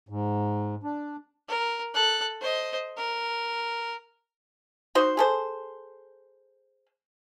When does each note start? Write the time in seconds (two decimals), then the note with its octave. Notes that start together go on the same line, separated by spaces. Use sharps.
0.09 G#2
0.84 D4
1.48 A#4
1.94 A4 F#6
2.41 C5 D#5
2.97 A#4
4.95 D#4 F#4 C5
5.17 G#4 A4 C5